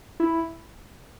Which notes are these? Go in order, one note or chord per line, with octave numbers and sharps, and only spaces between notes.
E4